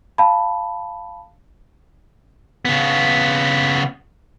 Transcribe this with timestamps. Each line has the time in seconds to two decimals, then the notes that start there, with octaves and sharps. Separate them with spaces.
0.18 F5 A5 B5
2.65 C#3 B3